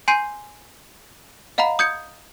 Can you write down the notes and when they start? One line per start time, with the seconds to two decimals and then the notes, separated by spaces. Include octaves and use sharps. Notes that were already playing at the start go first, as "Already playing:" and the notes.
0.08 G#5 C6 G6 C7 D#7
1.58 D#5 F5 F#5 A#5 B5
1.79 D#6 G6 G#6 C#7